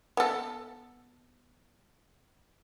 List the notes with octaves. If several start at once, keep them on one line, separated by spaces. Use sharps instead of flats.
B3 A4